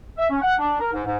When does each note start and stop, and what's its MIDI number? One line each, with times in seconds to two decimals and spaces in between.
0.18 0.30 76
0.30 0.37 61
0.42 0.54 78
0.59 0.77 62
0.80 0.90 70
0.93 1.04 44
1.05 1.17 44